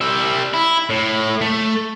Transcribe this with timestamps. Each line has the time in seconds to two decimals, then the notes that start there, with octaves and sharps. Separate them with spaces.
0.01 G3 E5
0.54 E4
0.90 A2
1.41 A3